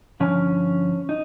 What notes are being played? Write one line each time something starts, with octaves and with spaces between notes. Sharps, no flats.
G2 D3 F3 C#4
D#4